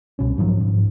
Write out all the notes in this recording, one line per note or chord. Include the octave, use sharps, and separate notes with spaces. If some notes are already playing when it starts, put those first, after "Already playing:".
C2 B2 C#4
G#2 D#3 F3 F#3
G#2